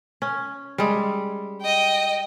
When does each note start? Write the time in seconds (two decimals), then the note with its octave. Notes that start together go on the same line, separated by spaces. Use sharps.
0.22 C#4
0.78 G3 G#3
1.62 D#5 G5